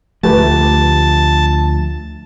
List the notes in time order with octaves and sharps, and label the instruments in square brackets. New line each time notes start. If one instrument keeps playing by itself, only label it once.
[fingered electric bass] D2 F3 [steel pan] A3 G4 B4 [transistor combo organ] A5